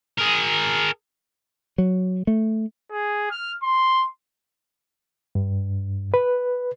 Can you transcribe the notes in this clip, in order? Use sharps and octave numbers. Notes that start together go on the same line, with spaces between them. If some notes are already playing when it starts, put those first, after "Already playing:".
G#4 A#4
F#3
A3
G#4
F6
C6
G2
B4